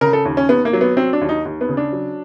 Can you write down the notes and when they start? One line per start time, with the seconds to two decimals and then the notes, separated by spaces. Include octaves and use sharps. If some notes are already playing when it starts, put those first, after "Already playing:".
0.01 C#3 A#4
0.13 A4
0.25 D#2
0.37 C#4
0.49 D#2 B3
0.65 A#3
0.73 F#3
0.81 B3
0.97 F#3 C4
1.13 D4
1.21 D#2
1.29 D#4
1.45 D#2
1.61 B3
1.69 C#3
1.77 D4
1.93 F#3